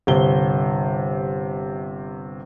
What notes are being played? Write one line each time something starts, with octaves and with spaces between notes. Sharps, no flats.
G1 C3 G7